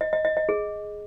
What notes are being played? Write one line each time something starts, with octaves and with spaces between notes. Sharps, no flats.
D#5
D#5
D#5
D#5
G#4